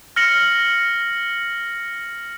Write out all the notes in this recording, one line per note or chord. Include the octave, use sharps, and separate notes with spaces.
F6 A#6 C#7 F#7